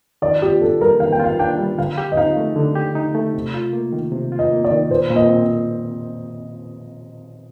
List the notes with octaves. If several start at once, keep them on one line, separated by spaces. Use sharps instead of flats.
D#3 D5
F4 G4
D4 A4
G3 A#4
D#3 F5
G5
F4 F5
D4 G5
G3
D3 F5
G4
D#5
D#4 F5
A3
D3
G4
D#4
A3
C3
F4
A#3
D#3
C3
F4
D#5
A#3
D5
D#3
A#2 C5
A#2
D#5
C4